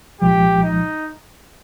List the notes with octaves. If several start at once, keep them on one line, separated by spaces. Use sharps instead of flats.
C2 A#2 F3 G#3 G4
D#4